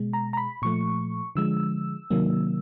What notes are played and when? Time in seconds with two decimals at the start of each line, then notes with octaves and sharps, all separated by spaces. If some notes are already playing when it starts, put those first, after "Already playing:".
Already playing: B2 G#3
0.13 A#5
0.33 A#5
0.37 B5
0.62 A#2 F3 A3 C#6
1.35 D3 F3 G#3 E6
2.10 C3 D#3 F#3 A#3